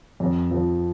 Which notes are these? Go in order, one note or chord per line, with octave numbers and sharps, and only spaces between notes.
F2
F3